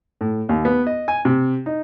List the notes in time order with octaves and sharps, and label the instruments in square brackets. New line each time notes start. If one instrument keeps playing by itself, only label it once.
[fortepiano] A2
D#2
B3
D#5
G#5
C3
D#4